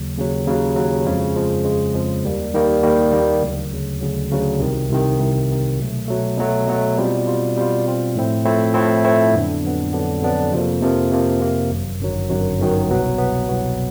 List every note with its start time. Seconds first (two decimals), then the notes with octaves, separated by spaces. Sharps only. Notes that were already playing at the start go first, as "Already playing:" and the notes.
Already playing: D#2 C#3 F#3
0.17 D#2 C#3 F#3
0.46 D#2 C#3 F#3
0.76 D#2 C#3 F#3
1.06 F2 C#3 F3 G#3
1.35 F2 C#3 F3 G#3
1.64 F2 C#3 F3 G#3
1.94 F2 C#3 F3 G#3
2.24 D#2 D#3 G3 A#3
2.54 D#2 D#3 G3 A#3
2.83 D#2 D#3 G3 A#3
3.12 D#2 D#3 G3 A#3
3.42 D2 C#3 F#3
3.72 D2 C#3 F#3
4.01 D2 C#3 F#3
4.31 D2 C#3 F#3
4.60 C2 C3 D#3
4.90 C2 C3 D#3
5.20 C2 C3 D#3
5.49 C2 C3 D#3
5.79 B2 F#3 A3
6.08 B2 F#3 A3
6.38 B2 F#3 A3
6.67 B2 F#3 A3
6.97 B2 G3 C4 F4
7.27 B2 G3 C4 F4
7.56 B2 G3 C4 F4
7.86 B2 G3 C4 F4
8.16 A2 F3 A3 C4 E4
8.45 A2 F3 A3 C4 E4
8.74 A2 F3 A3 C4 E4
9.04 A2 F3 A3 C4 E4
9.34 F2 D3 F#3 B3 D4
9.63 F2 D3 F#3 B3 D4
9.92 F2 D3 F#3 B3 D4
10.22 F2 D3 F#3 B3 D4
10.52 F2 C3 F3 A#3
10.81 F2 C3 F3 A#3
11.11 F2 C3 F3 A#3
11.41 F2 C3 F3 A#3
11.70 G1 F#2 D#3 F#3
12.00 G1 F#2 D#3 F#3
12.29 G1 F#2 D#3 F#3
12.59 G1 F#2 D#3 F#3
12.88 C2 B2 F#3 B3
13.18 C2 B2 F#3 B3
13.48 C2 B2 F#3 B3